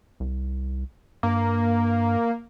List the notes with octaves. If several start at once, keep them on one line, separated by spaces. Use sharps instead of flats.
C2
G2 A#3